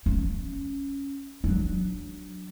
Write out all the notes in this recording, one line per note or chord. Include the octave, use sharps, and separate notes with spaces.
C#4
F#3 D4